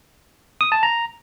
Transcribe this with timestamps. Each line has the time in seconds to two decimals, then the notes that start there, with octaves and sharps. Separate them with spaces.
0.61 D#6
0.72 A5
0.83 A#5